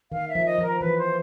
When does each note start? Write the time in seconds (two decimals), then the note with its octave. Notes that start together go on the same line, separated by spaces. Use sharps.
0.12 D#3 F5
0.29 E5
0.35 F3
0.46 D#5
0.58 F3
0.63 A#4
0.80 E3 B4
0.98 C5